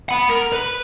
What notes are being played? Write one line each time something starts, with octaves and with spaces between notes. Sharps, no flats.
F#5 B5
A#4
B4